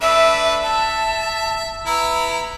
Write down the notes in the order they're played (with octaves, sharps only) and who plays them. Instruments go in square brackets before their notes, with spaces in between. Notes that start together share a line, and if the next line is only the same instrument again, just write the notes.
[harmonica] A3 D4 B4 [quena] E5
[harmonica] E5 [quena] A5
[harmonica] B3 E4 [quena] A#5